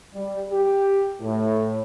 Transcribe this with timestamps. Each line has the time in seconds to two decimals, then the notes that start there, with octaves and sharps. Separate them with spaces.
0.14 G3
0.49 G4
1.20 A2